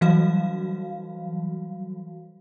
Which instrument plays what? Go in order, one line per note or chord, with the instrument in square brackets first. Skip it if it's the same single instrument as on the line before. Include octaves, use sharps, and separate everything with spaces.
[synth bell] E3 F#3 G3 F#4 F5